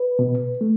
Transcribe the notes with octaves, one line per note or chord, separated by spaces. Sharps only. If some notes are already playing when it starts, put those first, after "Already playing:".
Already playing: B4
B2
A3